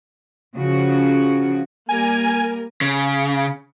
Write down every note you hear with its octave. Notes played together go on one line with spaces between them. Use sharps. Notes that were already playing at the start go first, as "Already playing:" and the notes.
C#3 F3 F#4
G3 A#3 A#4 G#5
C#3